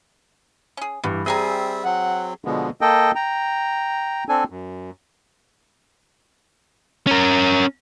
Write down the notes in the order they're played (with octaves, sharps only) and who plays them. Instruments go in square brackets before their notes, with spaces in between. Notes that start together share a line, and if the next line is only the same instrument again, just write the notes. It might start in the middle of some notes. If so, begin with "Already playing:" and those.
[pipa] C#4 G#4
[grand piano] G2 E3 [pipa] B3
[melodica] G3 C4 E5 [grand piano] G#4 [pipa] D#5 G#5 A#5
[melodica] F#3 C4 [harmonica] F#5
[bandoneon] B2 D3 F3 G#3 B3
A#3 A4 D#5 G5
G5 A#5
C4 D4 A4 G#5
F#2
[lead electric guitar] C#4 A#4